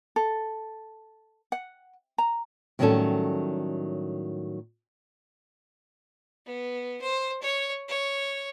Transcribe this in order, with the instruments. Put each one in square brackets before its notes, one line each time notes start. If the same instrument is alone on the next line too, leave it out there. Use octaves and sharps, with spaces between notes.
[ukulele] A4
F#5
A#5
[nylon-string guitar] A2 D#3 F#3 G3 C#4 A4
[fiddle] B3
C5
C#5
C#5